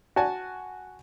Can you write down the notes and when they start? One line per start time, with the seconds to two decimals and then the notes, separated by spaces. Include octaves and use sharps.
0.16 F#4 F#5 G#5 A5